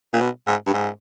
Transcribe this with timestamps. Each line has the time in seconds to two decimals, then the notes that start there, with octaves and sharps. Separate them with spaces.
0.13 A#2
0.21 B2
0.47 G#2
0.67 G2
0.73 G#2